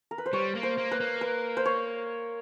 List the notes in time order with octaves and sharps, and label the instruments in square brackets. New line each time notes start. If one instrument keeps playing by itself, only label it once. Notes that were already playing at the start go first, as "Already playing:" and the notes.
[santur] A#4
B4
C5
[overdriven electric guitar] G3 [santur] C#5
[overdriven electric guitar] A#3
[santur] C5
[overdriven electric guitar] A#3
[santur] B4
[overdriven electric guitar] A#3
[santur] B4
C5
C#5